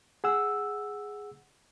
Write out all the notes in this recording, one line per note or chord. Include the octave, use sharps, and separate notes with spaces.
G#4 F#5 E6